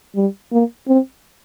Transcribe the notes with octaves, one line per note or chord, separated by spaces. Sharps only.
G3
A#3
C4